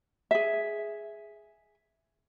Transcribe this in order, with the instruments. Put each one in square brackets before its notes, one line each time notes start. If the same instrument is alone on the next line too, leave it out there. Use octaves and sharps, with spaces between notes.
[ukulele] G#4 E5